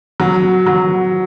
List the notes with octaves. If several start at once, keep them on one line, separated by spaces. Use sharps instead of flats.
F#3
F#3